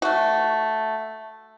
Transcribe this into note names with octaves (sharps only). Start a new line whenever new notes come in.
A3 F#4